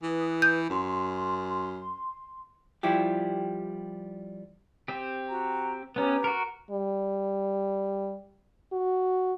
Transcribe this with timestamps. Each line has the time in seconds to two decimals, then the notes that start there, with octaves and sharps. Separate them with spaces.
0.03 E3 B4 D#6
0.42 G6
0.70 F#2 C6
2.83 F3 G3 E4 G4
4.88 C4 G4
5.29 F#4 A#5
5.96 B3 C#4 G4 B4 A#5
6.24 F#4 A#4
6.71 G3
8.73 F#4